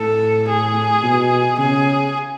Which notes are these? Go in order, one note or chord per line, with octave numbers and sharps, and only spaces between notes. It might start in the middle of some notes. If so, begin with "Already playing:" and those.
Already playing: A2 A4
G#4
B2
C#3 G#4